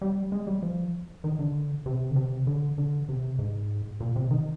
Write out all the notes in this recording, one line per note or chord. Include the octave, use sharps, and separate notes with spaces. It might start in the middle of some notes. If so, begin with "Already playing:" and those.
G3
G#3
G3
F3
D#3
D3
C3
D3
C3
D3
D3
C3
G#2
A#2
C3
D#3